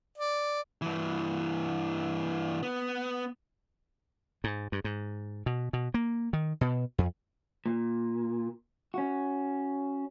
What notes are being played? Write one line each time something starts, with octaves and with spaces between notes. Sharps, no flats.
D5
G2 E3
B3
G#2
G2
G#2
B2
B2
A#3
D#3
B2
F2
A#2
C#4 F#4